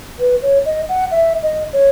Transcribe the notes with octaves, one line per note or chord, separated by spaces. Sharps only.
B4
C#5
D#5
F#5
E5
D#5
C#5